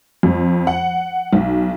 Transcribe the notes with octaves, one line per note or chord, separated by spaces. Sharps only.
F2
F#5
B1